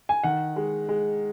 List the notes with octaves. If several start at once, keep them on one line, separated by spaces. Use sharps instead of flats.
G#5
D#3 F#5
G#3
G#3